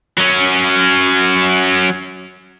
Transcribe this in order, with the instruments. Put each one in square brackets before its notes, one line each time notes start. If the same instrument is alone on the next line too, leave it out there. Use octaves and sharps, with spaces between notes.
[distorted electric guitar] F#3 C#4